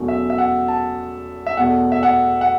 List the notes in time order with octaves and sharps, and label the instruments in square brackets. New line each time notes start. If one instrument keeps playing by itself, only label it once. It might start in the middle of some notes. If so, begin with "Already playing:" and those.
Already playing: [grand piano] E2 B2 F#3 A3 C#4
E5
E5
F#5
A5
E5
E2 B2 A3 F#5
E5
F#5
F#5